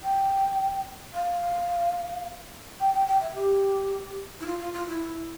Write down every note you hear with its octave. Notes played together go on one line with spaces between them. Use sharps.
G5
F5
G5
G5
G5
E5
G4
E4
F4
F4
F4
E4